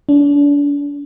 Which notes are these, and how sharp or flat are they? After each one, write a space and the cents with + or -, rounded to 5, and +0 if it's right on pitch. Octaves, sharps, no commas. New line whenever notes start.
D4 -35